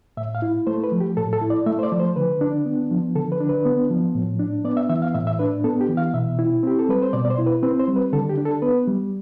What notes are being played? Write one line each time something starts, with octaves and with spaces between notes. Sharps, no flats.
A2 E5
F5
E4
A3 C5
B4
F3
G4
A2 A4
A4
E4
D5
A3 E5
C5
D5
F3
C5
D3 B4
D4
B3
F3
D3 A4
B4
D4
B4
B3
F3
A2
D4
B3 D5
E5
E3 E5
F5
A2 E5
E5
D4 B4
B3 A4
G4
E3
F5
B2 E5
E4
C4 G4
A4
G3 B4
C5
B2 D5
D5
C5
E4
B4
C4 B4
C5
G3
B4
D3 A4
G4
D4
A4
B3 B4
G3